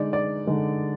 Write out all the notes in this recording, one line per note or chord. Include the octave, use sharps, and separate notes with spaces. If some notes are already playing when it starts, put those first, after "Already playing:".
Already playing: D3 G#3 D#4 D5
D5
D3 G#3 D#4